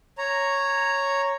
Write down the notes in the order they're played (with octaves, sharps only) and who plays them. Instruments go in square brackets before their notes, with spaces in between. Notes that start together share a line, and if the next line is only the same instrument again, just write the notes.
[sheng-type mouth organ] C#5 A#5